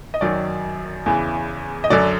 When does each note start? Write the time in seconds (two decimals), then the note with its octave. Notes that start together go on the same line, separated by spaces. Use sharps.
0.14 D#5
0.21 F#2 D#3 F#3 D5
1.06 E2 C#3 E3
1.84 D#5
1.90 F#2 D3 F#3 D5